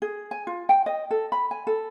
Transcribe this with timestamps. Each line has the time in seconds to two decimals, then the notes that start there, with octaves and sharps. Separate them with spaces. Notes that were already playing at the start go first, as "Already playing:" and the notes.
0.02 G#4
0.31 G#5
0.47 F4
0.69 G5
0.86 D#5
1.11 A4
1.32 B5
1.51 G#5
1.67 A4